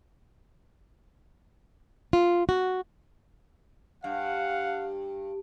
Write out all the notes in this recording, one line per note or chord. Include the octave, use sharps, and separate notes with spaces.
F4
F#4
G2 F5 F#5